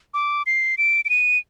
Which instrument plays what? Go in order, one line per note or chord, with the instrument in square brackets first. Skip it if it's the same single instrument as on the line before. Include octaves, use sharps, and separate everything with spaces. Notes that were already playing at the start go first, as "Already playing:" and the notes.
[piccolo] D6
C7
D7
D7
D#7